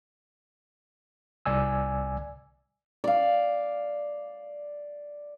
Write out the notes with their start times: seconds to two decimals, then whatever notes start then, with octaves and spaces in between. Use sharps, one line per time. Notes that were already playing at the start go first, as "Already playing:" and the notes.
1.46 C2 D5 G#5 E6
3.04 D5 F5